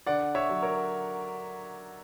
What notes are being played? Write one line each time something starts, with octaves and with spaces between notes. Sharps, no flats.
D3 D5 F#5
C#5 E5
F#3
A#4 C#5